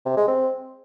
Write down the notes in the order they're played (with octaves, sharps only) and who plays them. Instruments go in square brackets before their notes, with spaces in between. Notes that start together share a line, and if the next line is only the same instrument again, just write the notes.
[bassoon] C3
G#3
C4